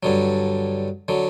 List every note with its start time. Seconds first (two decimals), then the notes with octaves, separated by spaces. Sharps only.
0.03 G2 D3 F#3
1.08 D3 F#3